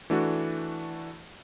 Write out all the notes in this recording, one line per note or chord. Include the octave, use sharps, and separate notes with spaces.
E3 A3 D4 F#4